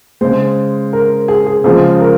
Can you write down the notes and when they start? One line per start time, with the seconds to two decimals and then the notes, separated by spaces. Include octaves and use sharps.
0.21 C#3 G#3 C5
0.93 A#4
1.28 G#4
1.46 G#4
1.64 C#3 F3 G#3 C5
2.00 A#4